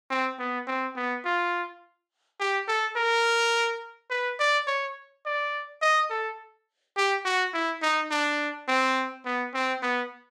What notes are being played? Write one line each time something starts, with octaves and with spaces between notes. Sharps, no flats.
C4
B3
C4
B3
F4
G4
A4
A#4
B4
D5
C#5
D5
D#5
A4
G4
F#4
E4
D#4
D4
C4
B3
C4
B3